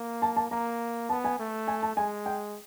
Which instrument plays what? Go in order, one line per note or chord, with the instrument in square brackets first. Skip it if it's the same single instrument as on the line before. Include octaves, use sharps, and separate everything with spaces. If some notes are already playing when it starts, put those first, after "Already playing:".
Already playing: [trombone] A#3
[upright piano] A5
A5
[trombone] A#3 [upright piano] A#5
[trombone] B3 [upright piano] A5
[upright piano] G#5
[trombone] A3
[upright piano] G#5
A5
[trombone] G#3 [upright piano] G#5
[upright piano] G5